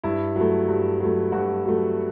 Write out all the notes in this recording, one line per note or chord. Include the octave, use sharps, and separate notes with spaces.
G2 E4
F#3 A3
G2
F#3 A3
G2 F#4
F#3 A3